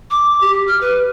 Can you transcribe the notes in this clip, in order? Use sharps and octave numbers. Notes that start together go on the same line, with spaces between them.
D6
G4
F6
B4